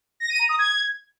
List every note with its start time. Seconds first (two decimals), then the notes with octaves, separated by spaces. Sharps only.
0.20 A#6
0.30 D#7
0.39 A#5
0.49 D#6
0.59 G#6